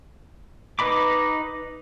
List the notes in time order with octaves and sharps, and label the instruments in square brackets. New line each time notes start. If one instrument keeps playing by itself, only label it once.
[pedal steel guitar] D#4 B4 D#5 B5 D6